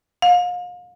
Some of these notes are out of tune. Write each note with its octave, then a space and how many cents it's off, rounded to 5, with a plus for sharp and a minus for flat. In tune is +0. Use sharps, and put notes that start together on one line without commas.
F5 +35